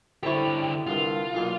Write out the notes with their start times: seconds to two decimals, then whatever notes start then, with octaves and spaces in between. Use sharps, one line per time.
0.23 D3 C4 E4 G4 A4 C#5
0.87 C2 G2 D3 F4
1.33 B1 A#2 A#3